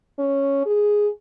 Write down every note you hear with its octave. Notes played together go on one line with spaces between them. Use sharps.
C#4
G#4